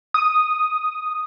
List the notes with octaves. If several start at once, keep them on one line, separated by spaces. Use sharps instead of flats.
D#6